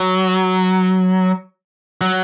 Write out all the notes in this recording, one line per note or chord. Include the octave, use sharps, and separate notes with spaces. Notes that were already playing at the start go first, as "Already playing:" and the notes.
Already playing: F#3
F#3